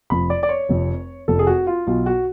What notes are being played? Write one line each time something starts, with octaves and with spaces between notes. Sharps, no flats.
F1 F2 F3 B5
D5
D5
C#5
F1 F2 F3
F1 F2 F3 A4
G#4
F#4
F4
B1 B2 F4
F#4